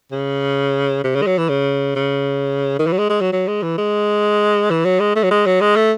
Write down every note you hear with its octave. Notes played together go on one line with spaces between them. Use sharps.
C#3
C3
C#3
G#3
F#3
E3
C#3
C#3
D#3
E3
F#3
G#3
G#3
F#3
F#3
G#3
E3
G#3
E3
F#3
G#3
A3
F#3
G#3
F#3
G#3
A3